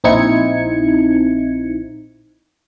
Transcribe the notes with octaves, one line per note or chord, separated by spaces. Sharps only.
A#1 C4 D#4 E4 G#6 C#7